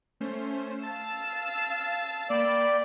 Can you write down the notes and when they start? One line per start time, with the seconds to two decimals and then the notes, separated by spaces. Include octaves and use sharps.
0.20 A3 C#4 C5
0.83 F5 A5 E6 A6
2.30 A#3 D5 G5 B5